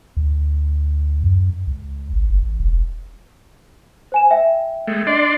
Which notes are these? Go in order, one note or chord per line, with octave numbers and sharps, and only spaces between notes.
D2
F#2
C#2
G#1
F#1
A1
E1
C5 G#5 E7
E5 G5
G#3 A3
D4 D5 D#5 C6